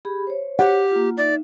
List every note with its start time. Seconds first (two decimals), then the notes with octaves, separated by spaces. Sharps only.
0.05 G4 G#4 B5
0.27 C5 C#5
0.59 G4 F#5
0.92 A#3 F4
1.17 D#4 D5 E5